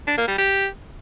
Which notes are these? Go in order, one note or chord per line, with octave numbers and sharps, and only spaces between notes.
D4
A#3
G3
G4